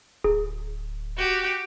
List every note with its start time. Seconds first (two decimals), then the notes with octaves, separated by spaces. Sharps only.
0.24 D1 G#4
1.17 F#4 G4